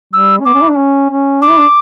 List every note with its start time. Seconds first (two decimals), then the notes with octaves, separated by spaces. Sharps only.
0.13 G3 E6
0.40 C#4
0.45 B3 D6
0.54 C#4
0.62 E4
0.70 D4
0.77 C#4
1.10 C#4
1.42 D4 D6
1.50 E4
1.59 D4